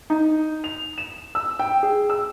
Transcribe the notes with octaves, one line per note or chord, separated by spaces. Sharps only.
D#4
F7
E7
E6
G5
G#4
E6